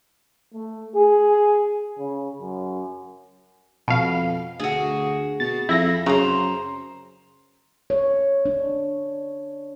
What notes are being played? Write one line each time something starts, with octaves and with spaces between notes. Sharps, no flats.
A3
G#4
C#3
F#2
F2 B2 F5
D2 F#4 G#4
B2 A6
F2 E4 A#6
F#2 C#3 C5 A#5
C#5
D4